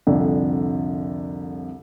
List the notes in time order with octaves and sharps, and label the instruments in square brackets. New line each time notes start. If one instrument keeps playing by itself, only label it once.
[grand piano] C2 F2 D3